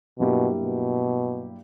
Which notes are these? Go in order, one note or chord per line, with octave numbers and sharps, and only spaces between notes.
G2 B2 F#3 A#3 E4 G4
B2